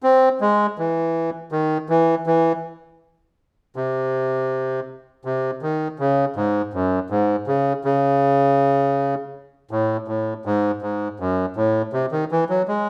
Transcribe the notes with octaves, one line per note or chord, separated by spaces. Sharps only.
C4
G#3
E3
D#3
E3
E3
C3
C3
D#3
C#3
G#2
F#2
G#2
C#3
C#3
A2
A2
G#2
G#2
F#2
A2
C3
D#3
E3
F#3
G#3